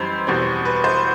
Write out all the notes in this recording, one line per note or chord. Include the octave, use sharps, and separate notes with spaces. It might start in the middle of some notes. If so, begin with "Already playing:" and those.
Already playing: F#2 E3 G3 D#4 C5 B5 C6
E2 B2 G3 C4
B4
C5